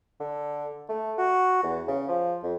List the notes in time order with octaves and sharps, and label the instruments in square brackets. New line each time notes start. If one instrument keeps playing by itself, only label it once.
[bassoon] D3
A3
F#4
E2
C#3
F3
F2